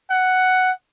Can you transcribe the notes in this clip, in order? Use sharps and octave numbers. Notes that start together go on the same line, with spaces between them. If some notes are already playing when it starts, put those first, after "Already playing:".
F#5